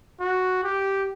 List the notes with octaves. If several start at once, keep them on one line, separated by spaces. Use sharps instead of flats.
F#4
G4